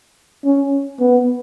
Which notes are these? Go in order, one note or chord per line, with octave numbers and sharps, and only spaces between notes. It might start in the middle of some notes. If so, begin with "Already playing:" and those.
C#4
B3